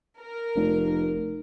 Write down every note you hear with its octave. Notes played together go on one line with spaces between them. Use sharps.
A#4
F1